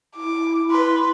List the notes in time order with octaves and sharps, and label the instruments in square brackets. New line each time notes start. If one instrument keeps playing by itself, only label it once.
[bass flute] E4 [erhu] D6
[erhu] B4 [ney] C6